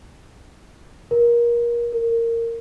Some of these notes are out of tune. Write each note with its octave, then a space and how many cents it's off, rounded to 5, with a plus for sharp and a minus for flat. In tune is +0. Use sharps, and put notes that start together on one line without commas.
A#4 +25
A#4 -15